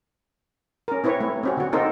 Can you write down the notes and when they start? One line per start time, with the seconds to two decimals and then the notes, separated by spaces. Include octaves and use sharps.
0.88 C#4 A#4
1.04 C4 E4 B4 C#5
1.20 A3
1.43 C4 C#4 F#4
1.57 D3 F#4
1.72 A#3 C4 D#4 A4 A#4 C5